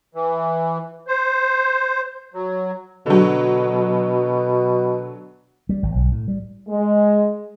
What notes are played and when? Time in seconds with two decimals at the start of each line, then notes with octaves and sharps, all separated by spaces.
0.15 E3
1.08 C5
2.34 F#3
3.06 B2 D3 F#3
5.69 G3
5.83 G#1
5.95 B1
6.12 A2
6.28 G3
6.69 G#3